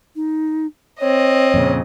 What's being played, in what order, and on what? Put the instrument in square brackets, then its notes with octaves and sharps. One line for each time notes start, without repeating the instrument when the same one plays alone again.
[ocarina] D#4
[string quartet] C4 D#5 [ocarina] C#5
[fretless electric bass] F2 A#2 C#3